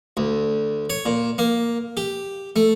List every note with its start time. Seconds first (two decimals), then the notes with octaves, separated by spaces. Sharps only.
0.17 D2
0.90 C#5
1.06 A#2
1.38 A#3
1.97 G4
2.56 A3